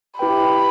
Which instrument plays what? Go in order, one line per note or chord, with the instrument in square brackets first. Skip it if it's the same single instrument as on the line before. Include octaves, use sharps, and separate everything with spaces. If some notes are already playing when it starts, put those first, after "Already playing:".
[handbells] E4 G4 B4 G5 [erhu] B5